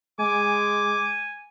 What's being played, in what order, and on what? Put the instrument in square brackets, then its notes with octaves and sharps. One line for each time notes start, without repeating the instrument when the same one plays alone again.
[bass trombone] G#3 [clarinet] G#5 [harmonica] D6